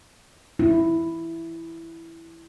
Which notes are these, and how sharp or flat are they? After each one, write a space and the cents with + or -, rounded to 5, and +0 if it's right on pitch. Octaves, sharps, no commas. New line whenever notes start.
E4 +5